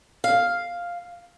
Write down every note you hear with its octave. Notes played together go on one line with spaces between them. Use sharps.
F5